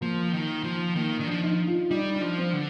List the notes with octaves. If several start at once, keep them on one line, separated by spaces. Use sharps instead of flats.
F3 A#3
D#3
F3
D#3 A#3
D#3 D4
F3
D#4
F4
G3 D#4
D4
F3
C4
D3